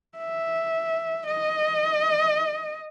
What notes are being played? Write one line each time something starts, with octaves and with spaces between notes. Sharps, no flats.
E5
D#5